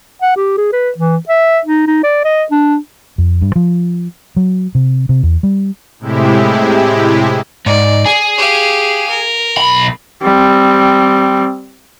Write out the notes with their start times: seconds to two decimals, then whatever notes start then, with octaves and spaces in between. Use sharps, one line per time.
0.22 F#5
0.37 G4
0.57 G#4
0.72 B4
0.98 E3
1.29 E5
1.65 D#4
1.87 D#4
2.03 D5
2.25 D#5
2.51 D4
3.18 F2
3.42 G2
3.56 F3
4.36 F#3
4.75 C3
5.09 C3
5.23 E2
5.43 G3
5.99 A2 C3 G#3 E4 G4
7.66 G#2 D5
8.06 G#4
8.38 G4 F5
9.09 A#4
9.57 B1 B5
10.23 G3 C4